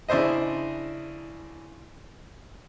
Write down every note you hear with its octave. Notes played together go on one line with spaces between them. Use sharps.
C#3 D4 E4 C5 D#5